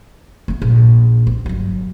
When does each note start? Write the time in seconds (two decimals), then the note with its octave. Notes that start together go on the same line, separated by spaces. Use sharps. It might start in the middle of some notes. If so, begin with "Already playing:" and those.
0.48 A3 B3
0.62 A#1
1.27 C4
1.46 G1 F#3